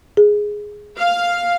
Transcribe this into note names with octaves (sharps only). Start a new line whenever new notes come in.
G#4
F5